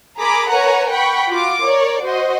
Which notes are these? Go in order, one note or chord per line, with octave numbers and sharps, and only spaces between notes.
G#4 A#4 A#5 B5 D6
A#4 B4 C#5 F#5 G#5 A#5
F#5 G5 B5 C#6
F4 F#4 D6
A#4 C#5 D5
F#4 C5 D#5